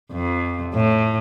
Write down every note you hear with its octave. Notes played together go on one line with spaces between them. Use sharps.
F2
A2